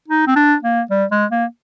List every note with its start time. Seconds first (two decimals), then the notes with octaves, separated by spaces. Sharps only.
0.08 D#4
0.27 C4
0.36 D4
0.63 A#3
0.90 G3
1.11 G#3
1.31 A#3